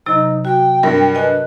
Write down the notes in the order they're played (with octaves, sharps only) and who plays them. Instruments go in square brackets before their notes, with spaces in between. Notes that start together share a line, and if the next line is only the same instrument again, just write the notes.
[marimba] C3 F#3 [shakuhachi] D#4
[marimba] F#4 [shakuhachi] G5
[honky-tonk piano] G2 [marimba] A#4
[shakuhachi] B4 [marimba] D#5 G#5